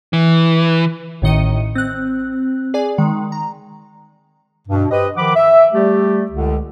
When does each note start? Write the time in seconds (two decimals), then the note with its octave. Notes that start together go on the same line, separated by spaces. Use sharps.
0.13 E3
1.22 A1 A2 D#3 D#5 C#7 D#7
1.75 C4 F#6
2.74 G#4 D5 G#5
2.98 D#3 G#3
3.32 A#5
4.68 G2 B2
4.91 G4 B4 C5 D#5
5.17 D#3 F3 F#5 B5 D6
5.36 E5
5.73 G3 A3 G4
6.31 C#2 D3